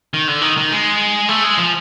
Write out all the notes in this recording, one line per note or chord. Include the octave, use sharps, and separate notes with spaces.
D#3
D3
D#3
D#3
G#3
A3
G#3
F3